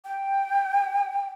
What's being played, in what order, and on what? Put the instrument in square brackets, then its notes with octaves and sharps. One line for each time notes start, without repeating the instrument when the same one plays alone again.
[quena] G5